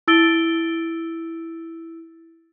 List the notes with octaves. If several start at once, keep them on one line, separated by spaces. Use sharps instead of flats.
E4 E6 A6 D7 G7